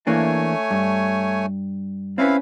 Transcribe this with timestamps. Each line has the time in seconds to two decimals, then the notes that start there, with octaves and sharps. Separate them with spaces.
0.07 E3 A3 A#3 D4 C#5 G#5
0.71 G2
2.18 C4 C#4 E4 B4 F5